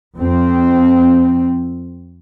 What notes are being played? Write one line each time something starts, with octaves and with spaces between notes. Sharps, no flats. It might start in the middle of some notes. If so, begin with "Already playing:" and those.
F2 C4